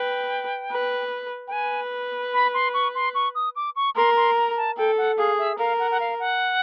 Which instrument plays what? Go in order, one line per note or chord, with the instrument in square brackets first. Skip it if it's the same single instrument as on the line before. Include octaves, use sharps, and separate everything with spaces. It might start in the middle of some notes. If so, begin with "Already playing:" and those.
Already playing: [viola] B4 [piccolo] G5
[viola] B4
[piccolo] G5
[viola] B4 [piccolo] G#5
[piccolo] B5
C6
C#6
C6
C#6
D#6
D6
C#6
[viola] A#4 [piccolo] C6
[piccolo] C6
A#5
A5
[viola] A4 [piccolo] G5
[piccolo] F#5
[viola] G#4 [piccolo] F5
[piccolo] E5
[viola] A#4 [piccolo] F5
[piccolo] F#5
F#5
F5
F#5